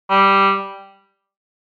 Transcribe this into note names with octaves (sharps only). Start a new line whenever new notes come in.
G3